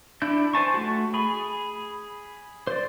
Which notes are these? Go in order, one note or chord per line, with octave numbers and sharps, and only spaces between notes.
D4 E4 G6
C5 G#5 A5 C#6
A3 F#4
G#4 B5
C5 D5